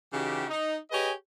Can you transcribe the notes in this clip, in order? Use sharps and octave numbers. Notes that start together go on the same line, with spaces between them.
C#3 E3 D#4 F#4 G4
D#4
G4 G#4 B4 C#5 D#5 G#5